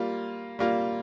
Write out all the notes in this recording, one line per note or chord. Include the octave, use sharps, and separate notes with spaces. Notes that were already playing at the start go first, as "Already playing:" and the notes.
Already playing: G3 A#3 F4
G3 A#3 F4